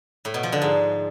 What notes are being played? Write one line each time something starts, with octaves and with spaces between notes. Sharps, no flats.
A2
B2
F3
D3
G#2